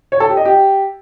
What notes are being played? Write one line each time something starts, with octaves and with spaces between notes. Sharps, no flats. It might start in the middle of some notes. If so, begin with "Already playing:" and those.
C#5
A4
G4
D#5
G4